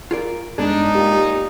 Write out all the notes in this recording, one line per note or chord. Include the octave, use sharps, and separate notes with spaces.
F4 G#4 A#4 D5
G2 G#3 B3 D4 D#4 G#4
A#2 G4